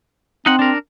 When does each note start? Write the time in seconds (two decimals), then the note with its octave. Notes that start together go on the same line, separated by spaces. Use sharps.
0.46 C4 D#4 F#5
0.59 D4 A#4